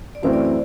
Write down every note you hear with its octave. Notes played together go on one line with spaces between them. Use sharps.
D5
F#2 E3 A3 C4 E4 C5
D5
D5